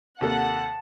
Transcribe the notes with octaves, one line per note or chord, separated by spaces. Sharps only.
D#2 C3 A#3 A4 F#5 A5